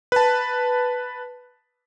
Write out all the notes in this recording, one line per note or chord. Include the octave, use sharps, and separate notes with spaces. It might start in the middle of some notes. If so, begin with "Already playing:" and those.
B4 A5